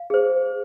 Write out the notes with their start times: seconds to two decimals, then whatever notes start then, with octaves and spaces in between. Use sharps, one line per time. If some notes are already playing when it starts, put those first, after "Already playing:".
Already playing: F5
0.10 G#4 C5